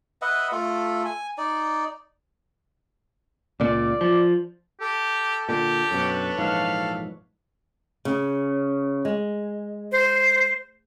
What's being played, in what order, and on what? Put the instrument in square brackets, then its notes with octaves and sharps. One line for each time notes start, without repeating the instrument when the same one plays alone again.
[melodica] B4 D#5 E5 F#5
A3 F4 A4
G#5
D#4 D5
[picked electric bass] C#2 A#2 [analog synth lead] D5
[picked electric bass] F3
[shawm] G4 [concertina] A4
[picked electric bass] A#2 D3 [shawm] G4
[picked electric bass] F#2 B2 [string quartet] D4 B4 C#5
[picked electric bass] A#1 G#2 E3 [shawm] F5
[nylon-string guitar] C#3
G#3
[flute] C5